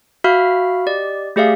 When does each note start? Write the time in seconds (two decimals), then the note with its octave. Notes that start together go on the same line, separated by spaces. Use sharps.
0.24 F#4 E5 F5 B5 F6
0.86 G4 D5 D#5
1.36 A3 G4 G#4 D5 E5 F5